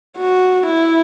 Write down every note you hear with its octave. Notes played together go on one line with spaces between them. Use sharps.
F#4
E4